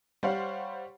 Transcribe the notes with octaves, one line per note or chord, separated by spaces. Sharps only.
G3 G4 C5 C#5 F5 F#5